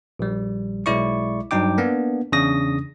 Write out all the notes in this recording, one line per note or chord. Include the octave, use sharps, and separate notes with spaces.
A#1 G3
B1 G#3 E4 D5 C#6
G2 F#3 D#4 G5 D6
A#3 B3 D4
E2 C#3 D4 D#6 A#6